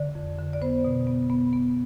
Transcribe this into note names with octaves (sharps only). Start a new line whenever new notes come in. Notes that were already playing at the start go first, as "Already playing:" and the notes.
Already playing: D3 D5
F2
D3
D5
B3 C5
B2
B3
B3
B3